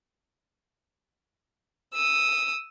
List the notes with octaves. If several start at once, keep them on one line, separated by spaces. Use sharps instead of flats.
D#6 E6